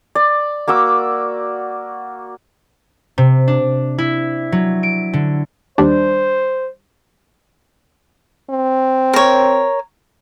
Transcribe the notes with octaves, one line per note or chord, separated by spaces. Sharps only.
D5
A#3 F#4 D6 E6
C3
D4
E4
F#3
D7
D3
D#2 G3 D4 C5
C4
A#4 C#5